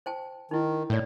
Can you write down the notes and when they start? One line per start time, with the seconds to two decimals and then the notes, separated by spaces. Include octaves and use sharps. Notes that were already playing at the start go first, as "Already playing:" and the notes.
0.06 C5 G5 A5
0.51 D#3 D#4 E4
0.90 A2 C#5 D5